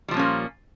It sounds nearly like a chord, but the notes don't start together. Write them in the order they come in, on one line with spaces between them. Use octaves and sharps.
G3 F3 A#2 C#4 A#3